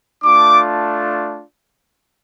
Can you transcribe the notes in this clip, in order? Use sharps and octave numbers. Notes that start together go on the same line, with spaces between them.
A3 D4 F4 D6